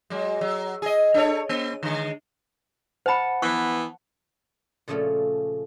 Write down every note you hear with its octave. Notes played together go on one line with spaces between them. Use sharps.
F#3 G#3
F#3
G#4 D#5
D4 A4 C#5
A#3
D3 G#3
C5 F#5 A5 B5 C#7
E3 B3 C#6
A#2 C#3 F3 A3 C#4